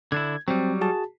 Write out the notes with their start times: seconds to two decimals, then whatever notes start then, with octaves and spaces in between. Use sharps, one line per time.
0.12 D3 D4 E4 G#6
0.48 F#3 G3 C4
0.81 F#4 G#4 A5